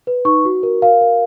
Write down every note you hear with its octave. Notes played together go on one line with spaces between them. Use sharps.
B4
D#4 C#6
F#4
A#4
A#4 F5
A#4